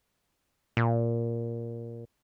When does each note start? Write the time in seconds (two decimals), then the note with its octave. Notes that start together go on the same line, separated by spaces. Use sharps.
0.77 A#2